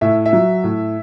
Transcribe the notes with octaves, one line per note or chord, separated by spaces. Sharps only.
A2 E5
E5
F#3
A2